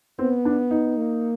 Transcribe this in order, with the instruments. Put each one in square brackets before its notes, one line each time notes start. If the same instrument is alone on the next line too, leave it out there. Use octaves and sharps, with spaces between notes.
[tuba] B3 [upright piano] C4
[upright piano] D4
D#4
[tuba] A#3